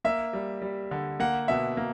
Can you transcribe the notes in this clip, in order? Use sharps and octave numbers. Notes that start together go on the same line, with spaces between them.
A#3 E5
G3
G3
D3
A#3 F#5
B2 E5
A#3